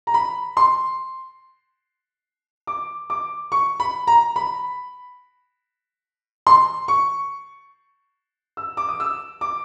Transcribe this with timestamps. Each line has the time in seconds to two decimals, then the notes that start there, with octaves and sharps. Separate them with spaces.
0.07 A#5
0.14 B5
0.57 C6
2.67 D6
3.10 D6
3.52 C#6
3.80 B5
4.07 A#5
4.36 B5
6.47 C6
6.88 C#6
8.57 E6
8.77 D6
8.89 D#6
9.00 E6
9.41 D6